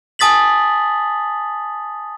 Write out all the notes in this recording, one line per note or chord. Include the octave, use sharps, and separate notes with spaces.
G#5 A5 D#6 A6 B6 F#7